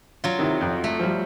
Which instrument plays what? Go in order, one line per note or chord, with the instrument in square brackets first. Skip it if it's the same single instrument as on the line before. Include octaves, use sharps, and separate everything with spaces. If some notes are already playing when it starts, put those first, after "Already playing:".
[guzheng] F#3 F4
[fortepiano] C3 D#3 E4
F2
[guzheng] A3
[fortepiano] F3 G3